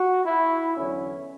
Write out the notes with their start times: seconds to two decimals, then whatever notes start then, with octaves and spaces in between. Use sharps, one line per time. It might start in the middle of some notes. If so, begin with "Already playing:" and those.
Already playing: F#4
0.25 E4
0.76 E2 D3 F#3 B3 C#4